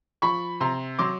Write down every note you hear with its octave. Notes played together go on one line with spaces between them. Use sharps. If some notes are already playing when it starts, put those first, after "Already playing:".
F3 B5 C#6
C3 A#5 C6
F#3 C6 D6